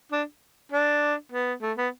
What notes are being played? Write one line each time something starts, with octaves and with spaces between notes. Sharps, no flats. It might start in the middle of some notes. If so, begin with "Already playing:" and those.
D4
D4
B3
A3
B3